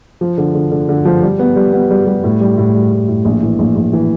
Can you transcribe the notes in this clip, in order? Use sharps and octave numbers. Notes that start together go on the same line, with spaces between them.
F3
D3
D3
D3
D3
F3
G3
B3
G3
B3
G3
G3
A2
G3
A2
G3
A2
A2
A#1
E3
A#1
A#1
E3